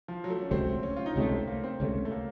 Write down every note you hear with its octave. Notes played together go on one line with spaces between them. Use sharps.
F3
F#3
A3
C#4
C#2 C3 F#3 A3 C4
C#4
F4
D#4
C#2 C3 F#3 A3 C#4
C4
A#3
C4
C#2 C3 F#3 A3 C#4
A3
A#3